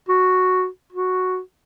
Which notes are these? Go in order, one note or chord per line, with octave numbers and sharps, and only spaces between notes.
F#4
F#4